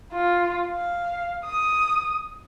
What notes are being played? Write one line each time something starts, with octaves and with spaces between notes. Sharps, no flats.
F4
F5
D#6